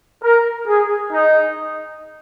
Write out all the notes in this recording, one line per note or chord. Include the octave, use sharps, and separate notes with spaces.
A#4
G#4
D#4